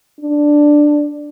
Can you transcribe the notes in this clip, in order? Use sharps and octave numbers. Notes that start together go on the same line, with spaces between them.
D4